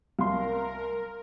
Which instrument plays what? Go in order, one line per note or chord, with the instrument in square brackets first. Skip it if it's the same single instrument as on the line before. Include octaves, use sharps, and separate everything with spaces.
[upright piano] C2 [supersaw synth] A#4 [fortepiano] F5 C6